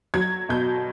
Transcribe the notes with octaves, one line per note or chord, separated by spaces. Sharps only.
F#3 G#6
B2 G6